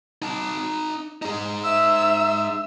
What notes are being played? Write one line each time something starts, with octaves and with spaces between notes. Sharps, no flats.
D#4 A5
D#4 G#4
E5 E6